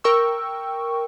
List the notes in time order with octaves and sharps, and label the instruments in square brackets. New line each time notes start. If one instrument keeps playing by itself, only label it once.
[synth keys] A#4 G5 C#6 E6